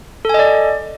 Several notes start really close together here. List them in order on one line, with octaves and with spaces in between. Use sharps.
A4 G#5 D#5 D5